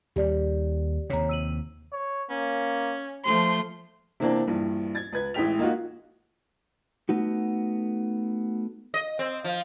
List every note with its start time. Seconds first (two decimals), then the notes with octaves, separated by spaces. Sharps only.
0.16 D#2 G3 G4 D5
1.10 D#2 C3 C#5 A#5
1.29 E6 D#7 F#7
1.93 C#5
2.30 A#3 C#4
3.25 F3 A3 C5 C6
4.20 C3 E3 A#3 C4 D4
4.47 A#1 G2 E3
4.95 G#6 A6
5.12 C#2 B4 G#6
5.34 A1 E3 G#3 G5 B6 F7
5.59 A#3 D#4 F4 F#4
7.09 A3 B3 D#4 F#4
8.94 D#5
9.19 C4
9.44 F3